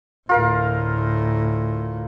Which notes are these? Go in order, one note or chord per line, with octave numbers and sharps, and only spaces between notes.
D2 A2 F4 A#4 F5